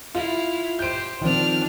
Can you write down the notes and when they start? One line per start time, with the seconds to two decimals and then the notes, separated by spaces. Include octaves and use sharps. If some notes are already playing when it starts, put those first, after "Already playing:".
0.15 E4 F4 F5
0.79 G4 C5 G6 D7
1.21 D#3 F3 C4 D4 F6